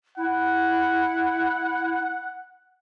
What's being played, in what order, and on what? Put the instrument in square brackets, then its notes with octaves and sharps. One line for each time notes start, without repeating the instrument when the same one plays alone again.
[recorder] E4 [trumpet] F#5